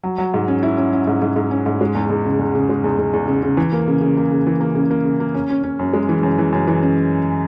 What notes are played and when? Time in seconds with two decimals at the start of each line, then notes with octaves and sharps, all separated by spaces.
0.03 F#3
0.18 F#3
0.34 G#2
0.48 C#4
0.63 E4
0.77 C#4
0.93 C#4
1.07 G#2
1.22 G#2
1.36 G#2
1.51 C#4
1.66 G#2
1.81 G#3
1.95 E2
2.10 E2
2.25 C#3
2.39 E2
2.55 C#3
2.69 G#3
2.84 E2
2.98 E2
3.13 E2
3.28 C#3
3.43 C#3
3.57 E3
3.73 A#3
3.88 C#3
4.01 C#3
4.17 A#3
4.31 C#3
4.47 E3
4.61 A#3
4.75 C#3
4.91 A#3
5.05 C#3
5.20 A#3
5.34 C#4
5.50 C#4
5.63 C#4
5.79 F#2
5.93 G#3
6.09 E3
6.23 F#2
6.38 E3
6.52 F#2
6.67 E3
6.82 C#4